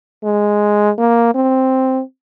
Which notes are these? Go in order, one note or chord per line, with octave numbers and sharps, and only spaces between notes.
G#3
A#3
C4